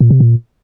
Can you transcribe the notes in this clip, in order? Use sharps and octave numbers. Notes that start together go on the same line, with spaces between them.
A#2
C3
A#2